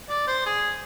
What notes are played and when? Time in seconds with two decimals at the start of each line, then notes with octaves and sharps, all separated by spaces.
0.09 D5
0.27 C5
0.46 G#4